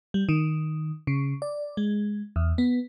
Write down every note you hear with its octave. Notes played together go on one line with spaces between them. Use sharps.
G3
D#3
C#3
D5
G#3
E2
B3